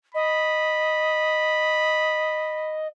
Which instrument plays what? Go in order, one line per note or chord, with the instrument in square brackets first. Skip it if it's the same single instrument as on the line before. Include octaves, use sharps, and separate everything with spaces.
[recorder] D#5 [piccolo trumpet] B5